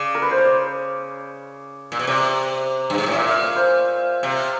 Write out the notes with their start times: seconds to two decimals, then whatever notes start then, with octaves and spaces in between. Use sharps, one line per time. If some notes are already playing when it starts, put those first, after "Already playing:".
Already playing: C#3 D5
0.15 A#4
0.22 B4
0.31 C5
0.38 C#5
0.45 D5
1.92 A#2
1.99 B2
2.07 C3 D5
2.90 G2
2.98 G#2
3.06 A2
3.14 A#2 E5
3.29 F5
3.43 C#5
3.56 C5
4.23 C3